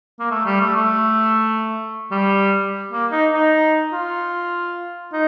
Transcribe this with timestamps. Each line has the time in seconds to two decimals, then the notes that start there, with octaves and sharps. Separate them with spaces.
0.20 A#3
0.31 A3
0.46 G3
0.61 A3
0.76 A3
2.11 G3
2.92 A#3
3.12 D#4
3.32 D#4
3.93 F4
5.13 D#4